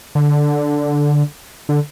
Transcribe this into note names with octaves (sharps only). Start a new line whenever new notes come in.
D3
D3